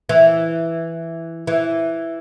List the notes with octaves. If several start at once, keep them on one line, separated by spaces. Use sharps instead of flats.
E3
E3